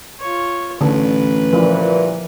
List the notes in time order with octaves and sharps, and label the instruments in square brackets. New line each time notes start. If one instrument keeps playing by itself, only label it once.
[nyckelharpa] F4 C#5
[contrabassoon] A1 [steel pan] D3 [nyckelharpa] B4
[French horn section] G2 A#2 E3 [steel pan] F3